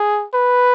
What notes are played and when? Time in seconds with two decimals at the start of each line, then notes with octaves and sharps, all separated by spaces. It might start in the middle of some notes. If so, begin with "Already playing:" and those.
Already playing: G#4
0.34 B4